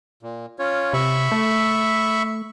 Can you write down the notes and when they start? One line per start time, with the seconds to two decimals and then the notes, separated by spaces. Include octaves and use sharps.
0.23 A#2
0.59 C#4 F4 C#5
0.93 C3 E5 B5 C#6
1.32 A3